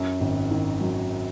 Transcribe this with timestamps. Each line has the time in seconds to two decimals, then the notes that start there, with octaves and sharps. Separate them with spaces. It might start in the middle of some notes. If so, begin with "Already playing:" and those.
Already playing: F#2
0.21 G#1
0.51 D#3
0.81 F#3